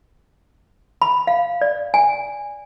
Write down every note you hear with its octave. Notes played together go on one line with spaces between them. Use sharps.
B5
F5
D5
G#5